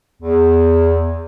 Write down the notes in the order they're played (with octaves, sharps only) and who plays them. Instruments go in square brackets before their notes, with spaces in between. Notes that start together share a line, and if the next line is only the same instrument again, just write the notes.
[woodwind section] E2